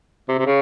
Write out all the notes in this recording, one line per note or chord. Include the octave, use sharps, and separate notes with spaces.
C3
C3
C#3